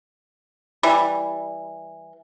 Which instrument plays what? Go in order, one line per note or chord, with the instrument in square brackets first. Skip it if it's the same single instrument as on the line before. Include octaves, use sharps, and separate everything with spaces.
[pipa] E3 G3